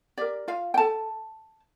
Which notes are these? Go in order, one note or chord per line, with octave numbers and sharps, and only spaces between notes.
G4 A#4 D5
F4 F5
G5
A4 A5